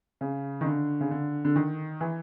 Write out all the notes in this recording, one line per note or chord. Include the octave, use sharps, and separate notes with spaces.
C#3
D#3
D3
C#3
D3
D3
D#3
E3